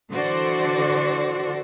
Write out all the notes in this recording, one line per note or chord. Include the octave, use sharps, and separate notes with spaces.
D3 E3 F#4 A4 C5 D5